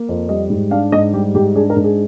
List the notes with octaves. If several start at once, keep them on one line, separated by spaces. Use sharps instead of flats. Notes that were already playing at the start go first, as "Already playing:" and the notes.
Already playing: A#3
F2
G3 D#5
G#2
D4 F5
G#2 D#5
G3 G4
G#2 G4
D4 G#4
A#4
G#2
G#4